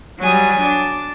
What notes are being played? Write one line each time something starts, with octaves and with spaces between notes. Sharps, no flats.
F#3 G3 G#5 D#6
D4